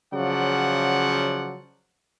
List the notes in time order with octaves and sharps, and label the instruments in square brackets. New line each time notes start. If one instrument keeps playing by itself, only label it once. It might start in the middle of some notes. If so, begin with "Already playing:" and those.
[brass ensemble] C#3 F3 F#3 D5 F#5